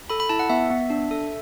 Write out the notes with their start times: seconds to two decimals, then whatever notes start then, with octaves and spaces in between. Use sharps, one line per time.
0.10 A4 B5
0.20 B5
0.29 E4 A5
0.39 F#5
0.50 B3 E5
0.70 B3
0.90 D4
1.11 A4